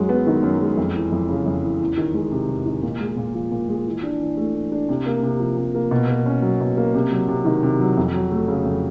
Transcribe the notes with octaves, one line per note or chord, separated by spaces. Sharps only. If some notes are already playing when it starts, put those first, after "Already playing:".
Already playing: F#2 F#3 G#3
B3
D#3
F#2
G#3
F2
E3
F2
C#3
F2
E3
E2
D#3
G#3
C3
E2
D#3
A#2
G#3
A#2
F3
A#2
G#3
E3
D4
E3
A3
E3
D4
C3
A#3
C3
F3
C3
A#3
B2
A#3
C#4
F#3
B2
A#3
C3
F#3
C3
D#3
C3
F#3
F2
F#3
A3
C#3
F2